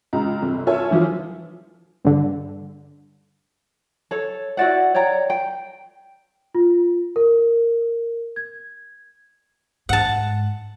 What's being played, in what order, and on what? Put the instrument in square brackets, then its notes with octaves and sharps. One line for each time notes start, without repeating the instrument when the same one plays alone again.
[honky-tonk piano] C#2 F4 A#5
G1 C3
F4 A4 C#5 E5 G#5
E3 F3 E4 F4
[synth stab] G2 D3
[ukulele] A4 C#5
E4 F#4 D5 F#5
C#5 D5 G5 A#5
G5
[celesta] F4
A#4
G#6
[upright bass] G#2 [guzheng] F#5 A5